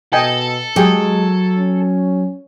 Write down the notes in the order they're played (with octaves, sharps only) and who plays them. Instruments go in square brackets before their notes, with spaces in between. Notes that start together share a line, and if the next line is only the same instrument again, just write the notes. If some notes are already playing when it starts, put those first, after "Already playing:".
[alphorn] B2 [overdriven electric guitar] A4 [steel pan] D#5 G5 G#5
[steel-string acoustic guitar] F#3 [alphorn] G#3 [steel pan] G4 G#4 G5
[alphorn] C#4